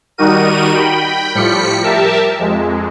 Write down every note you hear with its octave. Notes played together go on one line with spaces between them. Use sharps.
D#3 G3 D#4 F#4 A#4 D#7
G5 B5
A2 F3 G3 B6 C#7
G4 A#4 E5 A5
F2 G#3